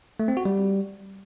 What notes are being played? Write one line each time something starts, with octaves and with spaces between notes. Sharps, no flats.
A3
C4
F#4
G3